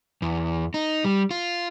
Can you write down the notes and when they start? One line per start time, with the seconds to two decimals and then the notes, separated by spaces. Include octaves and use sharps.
0.22 E2
0.74 D#4
1.04 G3
1.31 F4